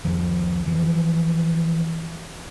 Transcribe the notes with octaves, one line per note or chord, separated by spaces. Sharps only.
F2 D#3 F3
E3 F3